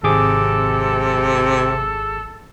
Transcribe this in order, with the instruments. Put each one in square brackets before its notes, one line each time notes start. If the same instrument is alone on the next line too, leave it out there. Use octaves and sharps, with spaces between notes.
[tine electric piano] G#1 G#4 D6 [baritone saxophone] C3 [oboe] A4